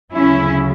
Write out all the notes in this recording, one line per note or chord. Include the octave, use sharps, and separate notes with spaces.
D2 C#3 F#3 C#4 E4